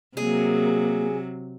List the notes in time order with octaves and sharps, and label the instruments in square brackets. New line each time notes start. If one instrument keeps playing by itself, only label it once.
[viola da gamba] C3 F#3 [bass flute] A#3 [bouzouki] G#4